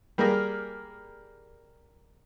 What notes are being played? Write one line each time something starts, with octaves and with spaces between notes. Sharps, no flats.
G3 A#3 G4 G#4 A#4